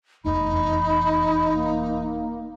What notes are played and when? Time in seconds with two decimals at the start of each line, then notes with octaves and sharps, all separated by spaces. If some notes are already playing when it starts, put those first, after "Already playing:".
0.24 F1 E2 D#4 B5
1.53 A#3